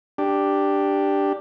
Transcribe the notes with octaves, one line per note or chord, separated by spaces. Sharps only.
D4 G4